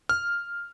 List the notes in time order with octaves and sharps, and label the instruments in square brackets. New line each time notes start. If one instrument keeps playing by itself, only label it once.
[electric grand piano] F6